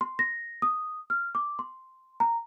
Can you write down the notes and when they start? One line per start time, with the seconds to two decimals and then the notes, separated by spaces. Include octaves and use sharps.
0.01 C6
0.19 A#6
0.62 D#6
1.10 F6
1.35 D6
1.59 C6
2.20 A#5